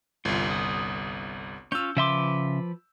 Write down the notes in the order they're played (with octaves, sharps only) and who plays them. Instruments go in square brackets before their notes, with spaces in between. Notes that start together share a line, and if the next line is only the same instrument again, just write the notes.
[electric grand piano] G1 C2 [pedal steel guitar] F4
[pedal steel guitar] D#6
[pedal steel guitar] C#4 F4 [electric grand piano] E6 G6
[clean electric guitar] C#3 E5 C6 [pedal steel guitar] F3 B4 D6